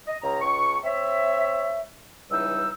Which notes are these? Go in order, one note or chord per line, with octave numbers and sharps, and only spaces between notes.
D#5
C#2 C#3 A#5
C#2 C#6
C4 C#5 E5
C#2 E3 G3 D#4 E6